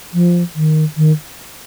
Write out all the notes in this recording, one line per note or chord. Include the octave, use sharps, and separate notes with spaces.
F3
D#3
D#3